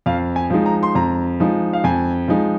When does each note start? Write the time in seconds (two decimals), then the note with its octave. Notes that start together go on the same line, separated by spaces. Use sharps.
0.06 F2 F5
0.36 G#5
0.50 F3 G#3 D#4
0.66 A#5
0.83 C6
0.95 F2 A#5
1.40 F3 G#3 D#4
1.73 F5
1.84 F2 G#5
2.28 F3 G#3 D#4